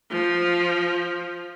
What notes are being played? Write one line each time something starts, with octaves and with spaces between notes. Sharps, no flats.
F3